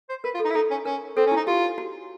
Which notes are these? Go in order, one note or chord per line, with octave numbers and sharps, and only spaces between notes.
C5
A#4 B4
F4
A4
D#4
E4
D#4 A4
C#4
C#4 A#4
C4 A4
C#4
D#4 E4
F4 G4
F#4